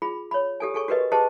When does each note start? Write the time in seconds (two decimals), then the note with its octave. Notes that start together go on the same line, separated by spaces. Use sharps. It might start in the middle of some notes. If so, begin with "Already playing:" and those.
0.02 F4 G#4 B5
0.31 C#5 B5
0.60 G4 A4 G#5
0.74 G#4 A4 G#5 C#6
0.88 F#4 G4 A#4 B4 D#5
1.12 G4 G#4 B4 C5 D#5 A5